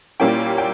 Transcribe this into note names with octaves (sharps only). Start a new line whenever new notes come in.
A#2 G3 A#3 C#4 E4 G5
G5